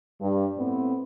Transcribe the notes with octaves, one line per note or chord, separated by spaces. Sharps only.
G2
A2 B3 C4